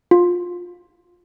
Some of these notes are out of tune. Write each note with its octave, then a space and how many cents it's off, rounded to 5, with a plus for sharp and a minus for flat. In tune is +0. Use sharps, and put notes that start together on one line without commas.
F4 +15